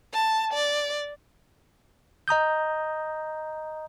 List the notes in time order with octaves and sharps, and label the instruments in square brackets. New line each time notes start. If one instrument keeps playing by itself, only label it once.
[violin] A5
D5
[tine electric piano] D#5 A#5 D#6 G6